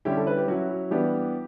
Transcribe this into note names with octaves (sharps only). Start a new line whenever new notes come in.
D3 G3 C#4 E4 G4
A4
B4
G4
F#3 C#4 E4 F#4
F#4
E3 G3 B3 D4 G4